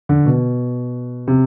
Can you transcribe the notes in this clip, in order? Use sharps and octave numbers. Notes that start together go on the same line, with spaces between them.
D3
B2
C3